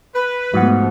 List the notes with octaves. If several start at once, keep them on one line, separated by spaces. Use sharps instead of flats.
B4
G#2 F3 A3 B3 F#4 F#5